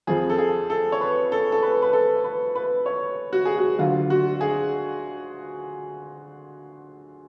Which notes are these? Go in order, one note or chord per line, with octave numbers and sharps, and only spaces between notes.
F2 F3 G#4
A4
G#4
A4
C#5
B4
A4
A4
B4
B4
A4
B4
B4
C#5
F#4
G#4
F#4
D2 D3 F#3 F4
F#4
G#4